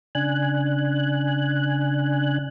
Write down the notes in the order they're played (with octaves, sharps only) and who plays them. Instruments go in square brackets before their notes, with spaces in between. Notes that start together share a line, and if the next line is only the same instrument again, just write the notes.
[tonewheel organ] C#3 D4 G#5 F#6